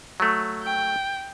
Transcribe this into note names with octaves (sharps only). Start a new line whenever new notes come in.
F#3 A3
G5